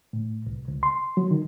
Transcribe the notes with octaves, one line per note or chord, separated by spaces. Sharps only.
A2
C2
C#2
C6
F#3
D#3